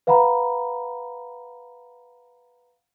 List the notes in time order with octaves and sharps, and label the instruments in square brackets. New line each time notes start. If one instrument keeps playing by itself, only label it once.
[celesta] B4 F5 F#5 A#5 B5